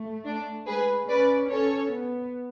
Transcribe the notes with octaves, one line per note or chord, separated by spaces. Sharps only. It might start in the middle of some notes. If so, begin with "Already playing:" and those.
Already playing: A3
D4
G#3 G#4 B4
C#4 B4 D5
C#4 A4 C#5
B3